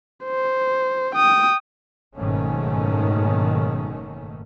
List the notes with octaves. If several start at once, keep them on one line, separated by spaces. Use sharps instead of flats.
C5
G5 D#6
F#1 G#2 B2 D#3 A3 C#4